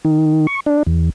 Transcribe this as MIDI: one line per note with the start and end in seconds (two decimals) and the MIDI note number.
0.05 0.47 51
0.47 0.60 85
0.66 0.83 62
0.87 1.10 40